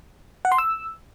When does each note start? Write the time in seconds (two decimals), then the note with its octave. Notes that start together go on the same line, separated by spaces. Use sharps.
0.45 F#5
0.52 C6
0.58 E6